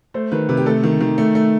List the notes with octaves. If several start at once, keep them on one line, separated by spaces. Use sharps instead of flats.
A3 C5
D#3 B4
C3 B4
G4
A3 A4
D#3
D#3
A3
A3